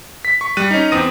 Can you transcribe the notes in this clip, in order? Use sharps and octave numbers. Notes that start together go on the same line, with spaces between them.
B6
C#6
G3 F#6 D#7
C#4 D#4
E2 C4 D#6 A#6 D#7